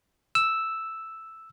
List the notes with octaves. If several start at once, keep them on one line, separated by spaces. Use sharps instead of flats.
E6